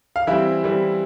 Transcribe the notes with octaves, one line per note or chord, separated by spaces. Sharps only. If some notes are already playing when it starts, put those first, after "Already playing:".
F5
E3 G3 C4 E4 E5
E3 G3 C4